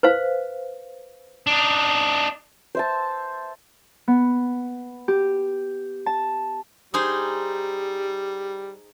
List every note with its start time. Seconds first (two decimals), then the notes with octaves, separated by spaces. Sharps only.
0.03 B4 C5 F5
1.47 D4 D#4
2.75 C5 E5 A5
4.08 B3
5.08 G4
6.06 A5
6.94 G3 D#4 G#4 C5